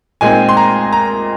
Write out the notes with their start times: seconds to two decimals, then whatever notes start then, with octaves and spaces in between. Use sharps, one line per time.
0.21 A#2 G#3 C4 D#4 G#5
0.49 C6
0.57 A#5
0.93 A#5